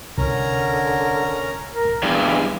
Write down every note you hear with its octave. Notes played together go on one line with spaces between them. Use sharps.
C2 D3 C#4 A#4 A#5
A#4
E2 G2 E3 G#5 B5